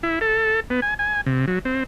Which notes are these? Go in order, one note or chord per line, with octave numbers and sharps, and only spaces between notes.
E4
A4
B3
G#5
G#5
C3
F#3
C4